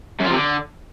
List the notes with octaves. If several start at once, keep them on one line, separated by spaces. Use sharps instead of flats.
F#2
F3
C3
D3